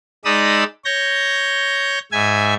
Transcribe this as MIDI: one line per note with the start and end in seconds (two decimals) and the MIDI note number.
0.25 0.64 56
0.25 0.64 63
0.25 0.64 74
0.25 0.64 83
0.25 0.64 87
0.25 0.64 88
0.85 1.99 73
0.85 1.99 91
0.85 1.99 94
2.12 2.54 44
2.12 2.54 76
2.12 2.54 80
2.12 2.54 92